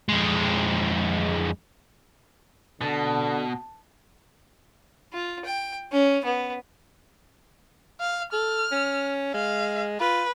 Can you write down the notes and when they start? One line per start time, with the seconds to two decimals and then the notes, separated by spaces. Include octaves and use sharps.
0.09 F2 G#3
2.81 B2 D3 A5
5.13 F4
5.45 G5
5.92 C#4
6.25 B3
8.01 F5
8.33 A4 F6
8.71 C#4
9.34 G#3 F5
10.00 F4 B4